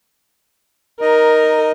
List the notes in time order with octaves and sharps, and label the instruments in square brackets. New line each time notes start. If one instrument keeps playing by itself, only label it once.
[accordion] D#4 D#5 [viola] A#4